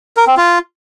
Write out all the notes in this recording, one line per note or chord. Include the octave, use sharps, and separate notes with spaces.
A#4
C4
F4